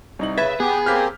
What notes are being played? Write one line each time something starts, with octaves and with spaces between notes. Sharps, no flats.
C2 D#4 F#7
C#3 B4 E5 G#6 A6
B3 G4 G#4
A#3 C4 G4 F6 G6 B6